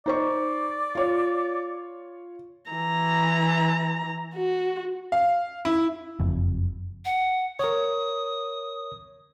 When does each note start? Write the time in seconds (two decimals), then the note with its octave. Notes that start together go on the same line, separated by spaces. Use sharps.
0.06 D#4 C5 D5 C#6
0.95 F4 C#5
2.71 E3 A#5
4.35 F#4
5.12 F5
5.65 E4
6.20 F#1 F2
7.05 F#5
7.59 A#4 C#5 D#6